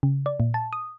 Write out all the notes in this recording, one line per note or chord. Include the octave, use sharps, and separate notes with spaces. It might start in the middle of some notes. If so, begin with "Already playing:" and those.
C#3
D5
A#2
A5
D#6